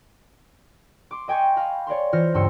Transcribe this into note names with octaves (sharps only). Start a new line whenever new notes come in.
C6 D6
D#5 G5 G#5 C6 C#6
F5 A#5 B5 F6
C#5 D5 A#5 C6
E3 F4 C5 F6 A#6 C#7
C#2 G2 C6 E6 C#7